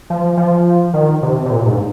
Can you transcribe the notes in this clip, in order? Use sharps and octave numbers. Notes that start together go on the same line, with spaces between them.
F3
F3
D#3
C3
C3
A#2
G#2